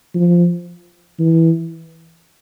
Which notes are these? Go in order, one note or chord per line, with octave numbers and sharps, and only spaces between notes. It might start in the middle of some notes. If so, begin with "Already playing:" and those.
F3
E3